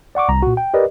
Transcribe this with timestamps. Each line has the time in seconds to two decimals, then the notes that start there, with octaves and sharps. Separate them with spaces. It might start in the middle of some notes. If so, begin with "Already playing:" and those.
0.15 D5 F#5 C#6 D6
0.29 C2 A#5
0.42 A#2 F#4
0.57 G5
0.74 G4 A#4 B4 D5 D#5